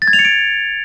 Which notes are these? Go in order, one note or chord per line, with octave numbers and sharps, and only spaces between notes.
A6
G#6
F7
C#7
D7